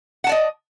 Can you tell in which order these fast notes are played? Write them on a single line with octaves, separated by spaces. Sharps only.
F#5 A5 D5 D#5